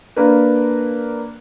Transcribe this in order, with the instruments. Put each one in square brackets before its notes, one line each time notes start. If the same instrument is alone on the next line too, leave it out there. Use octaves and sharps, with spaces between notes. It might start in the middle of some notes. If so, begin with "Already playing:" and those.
[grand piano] A#3 D4 A#4 B4